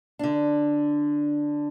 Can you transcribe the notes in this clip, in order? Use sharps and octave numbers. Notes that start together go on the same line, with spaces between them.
D3 D4